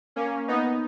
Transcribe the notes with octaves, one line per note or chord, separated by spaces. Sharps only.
A#3 C#4
B3 D#4